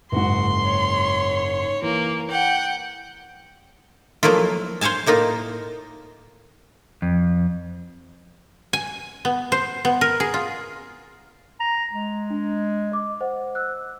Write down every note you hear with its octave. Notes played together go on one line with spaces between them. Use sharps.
F#1 G#2 F#4 C6
C#5
E3 A#3
F#5 G5
F3 F#3 A3 A#3 E4 F4
C5 C#5 F5 G#5 A5
A2 A#3 D#4 F4
F2
G#5
B3
C5
B3
A#4
G#4
F4
A#5
G#3
D4
D#5 D6
C5 D#5 F#5
E6 F#6